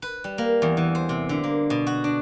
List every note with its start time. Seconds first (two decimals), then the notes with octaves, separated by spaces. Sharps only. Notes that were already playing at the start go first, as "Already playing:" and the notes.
0.02 B4
0.24 G3
0.38 A#3
0.62 E2
0.77 E3
0.95 C5
1.09 C3
1.29 D3
1.44 A#3
1.70 B2
1.87 F#4
2.04 D4